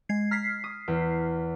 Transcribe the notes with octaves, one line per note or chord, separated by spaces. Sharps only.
G#3 G#6 C7
A#5 F6 B6 C7
D#6
E2